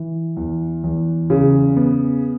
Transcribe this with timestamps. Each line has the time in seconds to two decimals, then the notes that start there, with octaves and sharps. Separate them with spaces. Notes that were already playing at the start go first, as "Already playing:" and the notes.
Already playing: E3
0.37 E2
0.84 E2
1.30 C#3
1.77 B3